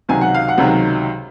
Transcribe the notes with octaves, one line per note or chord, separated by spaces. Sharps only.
C#2 C3 D#3 F#3 G#5
F#5
F5
F#5
C#2 C3 D#3 F#3